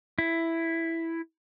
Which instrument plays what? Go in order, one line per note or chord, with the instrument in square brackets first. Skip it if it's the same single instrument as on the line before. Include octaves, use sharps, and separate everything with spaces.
[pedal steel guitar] E4